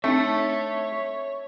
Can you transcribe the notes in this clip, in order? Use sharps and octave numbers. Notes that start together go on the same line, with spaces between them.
A3 C4 D4 D#4 C#5 E5 A5